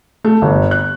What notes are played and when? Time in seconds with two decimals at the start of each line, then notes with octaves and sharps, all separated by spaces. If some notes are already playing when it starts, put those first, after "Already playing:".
0.24 A3
0.42 G1
0.71 F#6